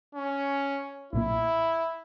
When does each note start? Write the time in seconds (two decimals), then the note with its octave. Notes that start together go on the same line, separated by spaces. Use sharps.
0.15 C#4
1.13 B1 A#2 A#3 E4